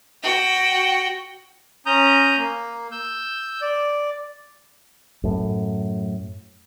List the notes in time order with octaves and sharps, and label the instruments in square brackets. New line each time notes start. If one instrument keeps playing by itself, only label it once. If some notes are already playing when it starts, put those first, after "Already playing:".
[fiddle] F#4 G5
[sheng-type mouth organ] C#4 A#5 D#6 G6
A#3
E6 G6
D5
[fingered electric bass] F#2 A2